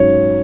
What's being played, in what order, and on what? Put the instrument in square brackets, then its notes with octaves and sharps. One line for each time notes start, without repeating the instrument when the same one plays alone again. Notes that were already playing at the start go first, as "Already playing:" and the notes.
Already playing: [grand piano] G#2 F#3 C#4 C#5